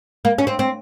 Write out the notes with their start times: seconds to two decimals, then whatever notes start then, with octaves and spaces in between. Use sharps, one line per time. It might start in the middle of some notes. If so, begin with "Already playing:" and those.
0.25 A#3
0.38 C#4
0.47 C4
0.59 C4